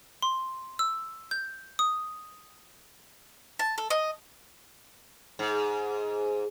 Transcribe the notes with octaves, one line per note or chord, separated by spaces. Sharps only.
C6
E6
G6
D#6
A5
A4
D#5
G#2